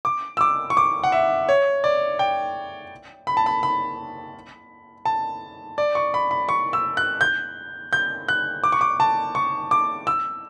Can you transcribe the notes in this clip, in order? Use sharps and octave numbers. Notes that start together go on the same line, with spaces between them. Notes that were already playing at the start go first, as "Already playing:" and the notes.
D6
E6
D6
C#6
D6
F#5
E5
C#5
D5
G5
B5
A5
B5
B5
A5
D5
C#6
B5
B5
C#6
E6
F#6
G6
G6
F#6
D6
C#6
D6
A5
C#6
D6
E6